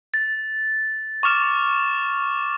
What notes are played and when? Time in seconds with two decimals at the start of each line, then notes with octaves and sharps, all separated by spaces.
0.14 A6
1.23 C#6 D6 F6 E7